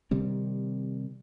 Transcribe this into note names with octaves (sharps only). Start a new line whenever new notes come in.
C3 D#3 G3 C4